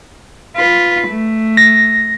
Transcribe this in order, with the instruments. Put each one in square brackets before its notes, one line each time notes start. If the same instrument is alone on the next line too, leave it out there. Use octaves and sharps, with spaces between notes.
[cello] F4 B4
A3
[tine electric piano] A#6